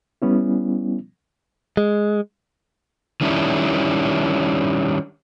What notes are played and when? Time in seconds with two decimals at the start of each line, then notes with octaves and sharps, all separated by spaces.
0.22 G3 B3 C#4 E4
1.77 G#3
3.21 D#3 G3 C#4 D4 E4